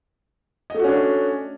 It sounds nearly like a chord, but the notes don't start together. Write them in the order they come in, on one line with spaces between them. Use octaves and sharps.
D#5 A3 F#4 C#4 D4